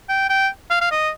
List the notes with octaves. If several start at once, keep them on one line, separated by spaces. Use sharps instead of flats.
G5
G5
F5
F5
D#5